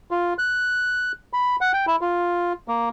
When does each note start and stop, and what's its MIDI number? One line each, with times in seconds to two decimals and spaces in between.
0.11 0.34 65
0.38 1.12 90
1.33 1.56 83
1.61 1.72 78
1.73 1.86 79
1.87 1.96 64
2.01 2.53 65
2.68 2.89 58